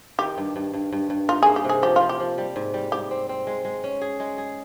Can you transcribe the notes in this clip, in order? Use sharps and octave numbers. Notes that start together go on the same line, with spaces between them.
D#3 G4
G2
G2
G2
G2
G2
D#4 F4
G#4
A#3
G4
C3
G#4
F3 G4
F3 F4
G4
F3
G3
G#2
G3
G#2 G4
C4
C4
G#3
G#3
C#4
G#4
G#3
G#4